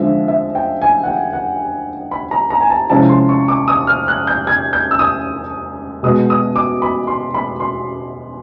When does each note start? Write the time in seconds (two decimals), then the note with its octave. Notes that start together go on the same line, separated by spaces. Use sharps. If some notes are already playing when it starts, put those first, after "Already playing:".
Already playing: D3 F3 G#3 C4 E5
0.28 E5
0.55 G5
0.82 G#5
1.03 F#5
1.08 G5
1.33 F#5
2.11 B5
2.31 A#5
2.50 A#5
2.61 G#5
2.70 A5
2.90 C3 F3 G#3 C#4 E4 A5
3.09 C6
3.29 C#6
3.48 D6
3.68 D#6
3.87 F6
4.08 F#6
4.27 G6
4.47 G#6
4.73 G6
4.91 E6
4.99 D#6
6.03 B2 G#3 B3 D#6
6.30 D#6
6.56 D6
6.82 B5
7.07 C6
7.34 B5
7.60 C6